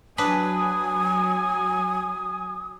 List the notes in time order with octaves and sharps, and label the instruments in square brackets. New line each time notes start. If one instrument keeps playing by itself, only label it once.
[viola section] F#3 G#5 [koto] D4 B4 [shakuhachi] D#6